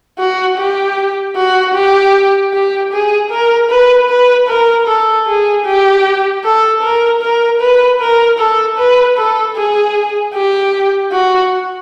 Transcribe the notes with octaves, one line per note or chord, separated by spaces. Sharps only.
F#4
G4
F#4
G4
G4
G#4
A#4
B4
B4
A#4
A4
G#4
G4
A4
A#4
A#4
B4
A#4
A4
B4
A4
G#4
G4
F#4